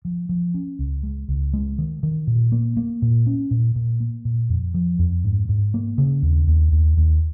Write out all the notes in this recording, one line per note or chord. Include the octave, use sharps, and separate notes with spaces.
F3
F3
C#4
C#2
G#3
C#2
G#3
D#3
D#3
A#2
A#3
A#3
A#2
C#4
A#2
A#2
A#3
A#2
F2
F3
F2
G#2
G#2
A#3
C#3
D#2
D#2
D#2
D#2